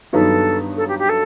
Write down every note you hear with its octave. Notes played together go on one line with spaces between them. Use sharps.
G2 D#3 F#3 B3 D#4 A4
A4
G4
G4
A4